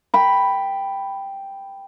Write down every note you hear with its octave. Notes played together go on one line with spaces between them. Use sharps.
G5 B5